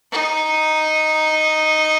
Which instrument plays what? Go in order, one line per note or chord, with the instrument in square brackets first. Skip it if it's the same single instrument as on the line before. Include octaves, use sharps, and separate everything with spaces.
[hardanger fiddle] D#4